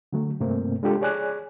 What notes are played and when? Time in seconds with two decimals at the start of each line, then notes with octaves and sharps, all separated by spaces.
0.13 D3 F#3 A3
0.40 G2 C3 A3 A#3 C4
0.83 G#3 D4 F4 G4 A4
1.01 G#4 C#5 D5 G#5 F#6